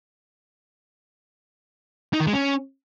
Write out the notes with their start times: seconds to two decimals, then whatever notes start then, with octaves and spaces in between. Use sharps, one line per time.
2.13 D#4
2.20 D#3
2.27 G#3
2.33 C#4